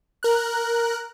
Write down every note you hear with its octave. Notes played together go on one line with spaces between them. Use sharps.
A#4 F#6